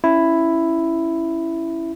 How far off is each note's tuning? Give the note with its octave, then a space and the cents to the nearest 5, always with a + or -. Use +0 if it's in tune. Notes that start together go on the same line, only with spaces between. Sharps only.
C#4 +0 E4 +5